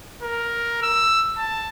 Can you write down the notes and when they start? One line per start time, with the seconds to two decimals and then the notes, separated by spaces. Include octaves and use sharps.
0.22 A#4
0.82 E6
1.37 A5